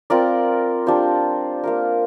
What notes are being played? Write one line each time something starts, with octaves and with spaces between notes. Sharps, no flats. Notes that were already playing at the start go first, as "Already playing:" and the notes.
C4 F4 A#4 D5
G3 D4 F4 C5
A#3 F4 A#4